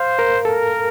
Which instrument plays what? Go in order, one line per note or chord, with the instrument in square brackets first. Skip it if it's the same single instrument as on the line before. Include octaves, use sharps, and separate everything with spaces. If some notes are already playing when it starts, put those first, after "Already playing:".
Already playing: [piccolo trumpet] C5 [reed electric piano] F5
[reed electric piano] A#4
[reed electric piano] A4 [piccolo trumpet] A#4